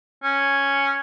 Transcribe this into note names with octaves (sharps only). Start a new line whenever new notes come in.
C#4